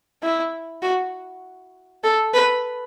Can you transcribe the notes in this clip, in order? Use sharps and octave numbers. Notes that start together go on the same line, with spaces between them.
E4
F#4
A4
B4